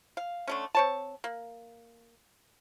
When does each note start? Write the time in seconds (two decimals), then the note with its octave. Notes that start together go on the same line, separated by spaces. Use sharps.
0.17 F5
0.47 D3 A3 C#4
0.75 C4 C#5 A5
1.24 A#3